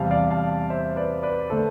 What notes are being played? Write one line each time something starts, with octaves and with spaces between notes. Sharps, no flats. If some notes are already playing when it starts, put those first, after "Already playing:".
Already playing: E2 C3 G3 F5 A5
D5 F5
F5 A5
C5 E5
B4 D5
B4 D5
D3 A3 A4 C5